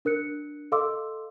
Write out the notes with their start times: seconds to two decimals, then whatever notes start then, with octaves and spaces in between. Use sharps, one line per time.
0.05 D4 A#4 F#6 C#7
0.72 A4 D#5 F5 C6 D6 E6